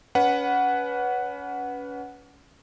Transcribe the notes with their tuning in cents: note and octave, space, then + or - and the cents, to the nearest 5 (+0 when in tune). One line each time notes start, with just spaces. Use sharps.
C#4 +30 B4 +0 F#5 +0